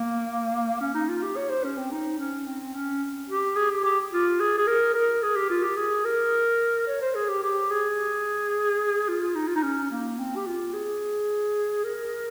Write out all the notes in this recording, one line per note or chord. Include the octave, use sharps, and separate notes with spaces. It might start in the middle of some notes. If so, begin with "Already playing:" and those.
Already playing: A#3
C#4
D#4
F4
G4
C#5
C5
C#4
C4
D#4
C#4
C4
C#4
G4
G#4
G4
G4
F4
G#4
G#4
A#4
A#4
G#4
G4
F4
G4
G#4
A#4
C#5
C5
G#4
G4
G4
G#4
F4
D#4
F4
D#4
C#4
A#3
C4
G4
F4
G#4
A#4